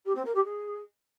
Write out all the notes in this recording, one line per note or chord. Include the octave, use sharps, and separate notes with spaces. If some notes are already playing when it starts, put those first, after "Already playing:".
G4
C4
A#4
G4
G#4